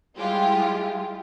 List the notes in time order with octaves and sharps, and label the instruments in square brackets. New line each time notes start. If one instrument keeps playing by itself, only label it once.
[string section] G3 G#3 E4 F4 G4